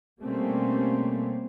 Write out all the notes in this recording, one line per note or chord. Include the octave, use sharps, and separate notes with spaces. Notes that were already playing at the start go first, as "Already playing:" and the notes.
B2 G3 A3 A#3 C4 C#4